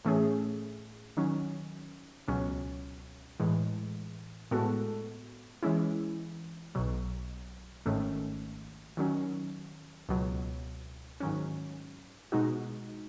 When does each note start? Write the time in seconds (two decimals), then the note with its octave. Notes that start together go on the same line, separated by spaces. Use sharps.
0.05 A2 E3 A3 C#4 G#4
1.17 D#3 F#3 C#4
2.28 C#2 B2 F#3 C#4
3.40 A2 E3 G#3
4.51 A2 G#3 B3 F#4 A4
5.63 E3 G#3 C#4 E4
6.75 B1 B2 F#3
7.86 G#1 G#2 D#3 A3 C#4
8.97 D#3 F#3 C#4
10.09 C#2 B2 F#3
11.20 G#2 D#3 F#3 C#4
12.32 B2 G#3 D#4 F#4